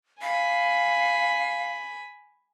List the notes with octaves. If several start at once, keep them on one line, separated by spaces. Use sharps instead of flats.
F5 G#5 B5